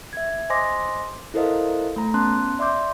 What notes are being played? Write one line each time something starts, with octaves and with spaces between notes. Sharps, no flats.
E5 G#6
C5 D#5 G#5 C6 D6 A#6
E4 A4 A#4 C5 D#5 F5
A3 A#5
B3 C#4 A5 C6 F#6
D5 E5 C6 D6 G6